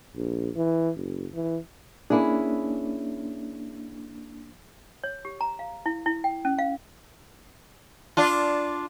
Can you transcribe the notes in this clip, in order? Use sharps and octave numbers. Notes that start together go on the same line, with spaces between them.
A#1
E3
F#1
E3
A#3 C#4 D4 E4 G#4
C#5
G4
A#5
F5
E4
E4
G5
C#4
F5
D4 F4